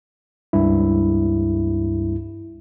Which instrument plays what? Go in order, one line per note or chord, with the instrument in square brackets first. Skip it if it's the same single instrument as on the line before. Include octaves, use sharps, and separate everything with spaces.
[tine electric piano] C#2 G2 E4